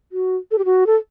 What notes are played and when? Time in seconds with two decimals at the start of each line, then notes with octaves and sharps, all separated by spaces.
0.12 F#4
0.51 A4
0.58 G4
0.65 F#4
0.86 A4